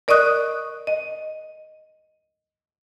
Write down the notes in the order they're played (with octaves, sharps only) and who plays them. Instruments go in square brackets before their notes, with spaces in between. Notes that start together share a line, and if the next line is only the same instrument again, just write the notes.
[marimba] A#4 D5 D#5 C#6 D#6 F#6
D#5